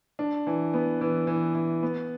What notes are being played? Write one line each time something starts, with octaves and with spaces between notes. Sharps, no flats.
D4
E3
B3
E3
E3
E3
B3